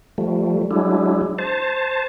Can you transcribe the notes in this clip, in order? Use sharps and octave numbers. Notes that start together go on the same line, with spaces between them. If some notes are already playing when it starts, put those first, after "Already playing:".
F3 G3 A3
F#3 G#3 D4 E4
C5 A5